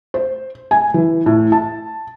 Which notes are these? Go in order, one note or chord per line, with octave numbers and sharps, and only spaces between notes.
C5
G#5
E3
A2
A5